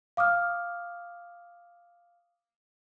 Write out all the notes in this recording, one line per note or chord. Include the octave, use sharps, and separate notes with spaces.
F5 D6 D#6 F6